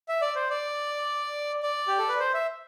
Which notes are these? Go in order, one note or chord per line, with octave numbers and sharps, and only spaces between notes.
E5
D5
C5
D5
D5
G4
A4
B4
C5
E5